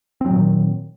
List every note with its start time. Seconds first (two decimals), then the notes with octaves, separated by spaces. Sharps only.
0.21 C4
0.26 F#3
0.31 A#2
0.35 D#3